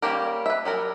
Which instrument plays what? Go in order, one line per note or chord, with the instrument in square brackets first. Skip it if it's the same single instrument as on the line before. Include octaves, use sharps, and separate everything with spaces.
[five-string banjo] G3 A#3 C#4 G4 A#4
B4 E5
F#3 G3 A#4